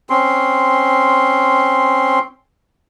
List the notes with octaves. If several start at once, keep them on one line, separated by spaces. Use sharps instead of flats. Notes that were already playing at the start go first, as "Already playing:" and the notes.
C4 C#4 C6